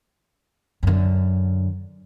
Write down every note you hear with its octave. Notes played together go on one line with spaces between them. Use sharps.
F#2 D3